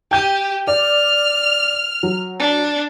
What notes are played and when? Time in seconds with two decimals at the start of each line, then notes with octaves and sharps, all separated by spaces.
0.11 G4 G5 G6 D#7
0.67 D5 F6
2.03 F#3
2.39 D4